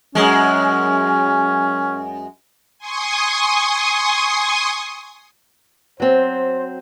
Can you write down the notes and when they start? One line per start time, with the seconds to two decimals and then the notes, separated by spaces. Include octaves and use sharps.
0.15 F#2 G#3 C#4
2.78 G#5 C6 C#6 D#6
6.00 F#3 C4 C5